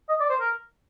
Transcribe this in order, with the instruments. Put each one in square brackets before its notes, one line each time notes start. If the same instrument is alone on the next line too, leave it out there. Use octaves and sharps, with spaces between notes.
[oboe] D#5
D5
C5
A#4